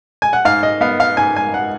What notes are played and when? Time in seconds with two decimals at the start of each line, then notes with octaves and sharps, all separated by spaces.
0.22 G#5
0.33 F#5
0.45 G#2 F5
0.63 D#5
0.81 B3 F5
1.00 F5
1.17 G#2 G#5
1.36 G#5
1.54 F#5